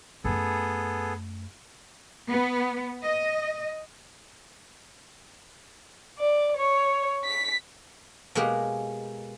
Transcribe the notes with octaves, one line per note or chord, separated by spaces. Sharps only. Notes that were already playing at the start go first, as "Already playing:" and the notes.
F#2 A3 B3 G#4 A4
B3
D#5
D5
C#5
B6
B2 G#3 A#3 G4 A#4